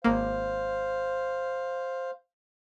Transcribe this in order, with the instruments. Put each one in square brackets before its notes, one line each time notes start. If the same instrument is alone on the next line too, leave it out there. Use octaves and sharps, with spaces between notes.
[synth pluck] G#1 A#3 [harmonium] C5 F5